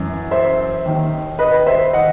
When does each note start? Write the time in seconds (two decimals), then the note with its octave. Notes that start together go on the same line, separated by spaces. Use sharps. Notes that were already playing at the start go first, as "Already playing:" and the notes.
Already playing: F#2 E3
0.31 C5 E5
0.85 D#2 D#3
1.39 B4 D#5
1.67 C5 E5
1.93 D#3 D#5 F#5